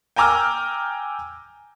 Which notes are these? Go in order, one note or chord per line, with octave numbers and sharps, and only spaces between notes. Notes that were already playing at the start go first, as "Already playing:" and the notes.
G5 G#5 A#5 D6 E6 F6